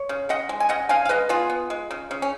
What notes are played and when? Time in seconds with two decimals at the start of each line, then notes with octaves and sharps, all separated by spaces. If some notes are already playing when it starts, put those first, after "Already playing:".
Already playing: C#5
0.09 C#3
0.29 C#3 D#5 F#5
0.49 G#3
0.60 G#5
0.69 C#3 D#5 F#5
0.89 C#3 F5 G#5
1.05 F5
1.09 G#3 B4 D#5
1.29 B3 F4 G#4
1.50 B3
1.70 G#3
1.91 C#3
2.11 C#3
2.22 C#4